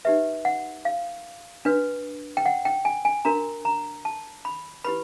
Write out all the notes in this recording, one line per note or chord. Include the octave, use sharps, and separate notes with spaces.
D#4 G4 B4 E5
F#5
F5
D4 F#4 B4
G5
F#5
G5
G#5
G#5
D4 F#4 A#4 A#5
A#5
A5
B5
E4 G4 B4 B5